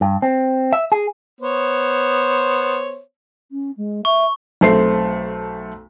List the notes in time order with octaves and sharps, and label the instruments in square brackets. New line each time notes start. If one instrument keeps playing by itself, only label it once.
[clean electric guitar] G2
C4
E5
G#4
[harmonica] B3 C5 C#5
[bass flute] C#4
G#3
[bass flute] E5 [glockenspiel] C#6
[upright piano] B1 A3 C4 C7